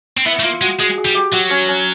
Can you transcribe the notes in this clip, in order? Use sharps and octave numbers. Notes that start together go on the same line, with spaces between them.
C4
B3 E4
A3
A#3 F4
G#3 F#4
G#3 G#4
G#4
G3
G4
F#3 F#4
C#4
C#4